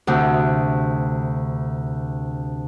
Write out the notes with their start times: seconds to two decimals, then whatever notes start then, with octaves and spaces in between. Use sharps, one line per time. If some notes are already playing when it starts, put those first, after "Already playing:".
0.07 D2 C3